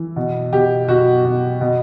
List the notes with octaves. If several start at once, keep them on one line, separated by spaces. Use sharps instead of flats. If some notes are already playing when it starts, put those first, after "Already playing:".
Already playing: E3
B2
B2 G4
B2 F#4
B2
B2